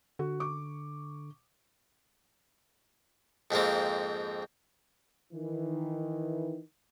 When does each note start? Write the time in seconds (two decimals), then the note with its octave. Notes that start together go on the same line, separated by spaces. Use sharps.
0.19 D3 F#4
0.40 C#6 D6
3.51 F2 G#2 A#3 C4
5.33 D#3 E3